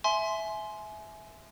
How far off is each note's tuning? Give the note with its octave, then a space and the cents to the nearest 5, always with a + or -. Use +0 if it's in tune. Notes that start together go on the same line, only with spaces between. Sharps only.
E5 +0 G#5 +25 C6 +0